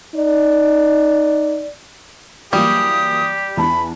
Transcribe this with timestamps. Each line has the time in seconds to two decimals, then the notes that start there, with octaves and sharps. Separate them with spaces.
0.15 D#4 D5
2.53 E3 F#3 G3 A#3 G4 D#6
3.57 E2 E3 A5 B5